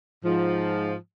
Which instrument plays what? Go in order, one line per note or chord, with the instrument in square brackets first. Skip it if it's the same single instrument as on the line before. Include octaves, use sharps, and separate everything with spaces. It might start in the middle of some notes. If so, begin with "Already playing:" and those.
[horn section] G#2 F3